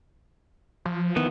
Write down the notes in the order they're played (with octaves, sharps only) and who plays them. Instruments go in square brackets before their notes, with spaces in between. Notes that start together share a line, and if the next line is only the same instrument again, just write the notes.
[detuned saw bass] F3
[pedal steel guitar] D#3 E3 B3